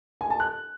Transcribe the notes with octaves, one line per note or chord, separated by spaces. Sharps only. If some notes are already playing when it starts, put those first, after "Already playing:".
G#5
A5
F#6